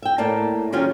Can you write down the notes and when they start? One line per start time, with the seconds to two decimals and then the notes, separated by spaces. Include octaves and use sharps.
0.02 E5 G5
0.18 A2 A#3 D5 A5
0.72 D#3 F#3 C#4 F4 G4 G#4